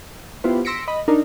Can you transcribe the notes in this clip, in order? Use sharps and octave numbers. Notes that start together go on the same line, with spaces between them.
B3 E4 F4 G4 B4 C5
C6 E6 A#6 B6 C#7 D7
D#5 B5
D4 D#4 A#4